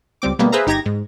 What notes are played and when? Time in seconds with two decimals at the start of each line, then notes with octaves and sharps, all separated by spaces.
0.22 C#2 G3 C4 D6
0.39 D2 B2 G3 A#3 B3
0.52 G#4 B4 C5 E5 F5 A#5
0.67 G1 D#4 G4 A#5 G#6 A#6
0.86 G#2